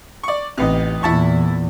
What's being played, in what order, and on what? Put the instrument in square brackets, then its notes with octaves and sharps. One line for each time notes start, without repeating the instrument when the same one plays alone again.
[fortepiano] D5 C#6
[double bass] A1 [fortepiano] C3 B3 D#4
[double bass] E2 A#2 [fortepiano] E4 A5 C#6